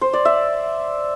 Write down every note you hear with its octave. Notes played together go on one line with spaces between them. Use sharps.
C5
D5
E5